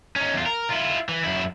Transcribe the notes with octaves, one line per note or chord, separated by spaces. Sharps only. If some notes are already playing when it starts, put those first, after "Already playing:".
C#4 D#4
E2 F4
A#4
E4 F4
E3
F#2 E4